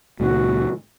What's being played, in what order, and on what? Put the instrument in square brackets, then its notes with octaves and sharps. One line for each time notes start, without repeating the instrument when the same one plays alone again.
[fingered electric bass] C#2 A#2 D#3 [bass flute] F#4